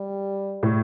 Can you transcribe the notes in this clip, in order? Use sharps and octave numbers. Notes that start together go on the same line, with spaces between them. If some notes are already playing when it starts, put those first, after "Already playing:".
Already playing: G3
A2